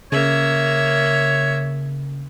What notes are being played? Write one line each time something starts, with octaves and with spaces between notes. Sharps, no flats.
C#3 A#3 C#5 E5